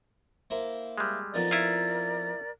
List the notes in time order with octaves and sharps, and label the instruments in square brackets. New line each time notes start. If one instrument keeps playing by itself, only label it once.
[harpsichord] A#3 E4 C5
[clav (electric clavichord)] G3 G#3
[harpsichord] F2 B3 D#4 [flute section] A#4 D5
[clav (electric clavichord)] E4 F4